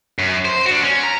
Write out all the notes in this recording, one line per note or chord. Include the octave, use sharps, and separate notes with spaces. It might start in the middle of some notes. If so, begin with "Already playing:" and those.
F#2
C5
D4 F#4
C#4
A#5